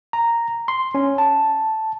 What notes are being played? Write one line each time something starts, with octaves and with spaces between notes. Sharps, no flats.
A#5
C6
C#4
A5